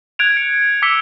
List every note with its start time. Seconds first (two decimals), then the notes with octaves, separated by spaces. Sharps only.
0.19 F#6 G#6 D7 F7
0.37 C#7
0.82 D6 E6 B6 C#7 G7